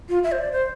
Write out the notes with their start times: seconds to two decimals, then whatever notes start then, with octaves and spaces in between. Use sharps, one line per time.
0.09 F4
0.24 E5
0.32 C5
0.39 D5
0.52 C5